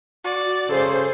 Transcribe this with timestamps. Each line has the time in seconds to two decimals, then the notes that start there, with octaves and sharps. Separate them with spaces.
0.24 F#4 D5
0.69 C#3 G#4 A4 C5